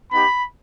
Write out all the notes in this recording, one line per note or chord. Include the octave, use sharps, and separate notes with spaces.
B3 D#4 G4 B5